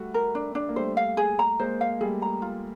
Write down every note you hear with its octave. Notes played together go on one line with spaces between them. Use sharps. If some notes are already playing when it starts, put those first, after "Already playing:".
Already playing: G3 A3 F#4
A#4
D4
D4
A#3
G3 A3 C5
F5
G#4
A#5
G#3 A#3 C5
F5
G3 A3 G#4
A#5
F4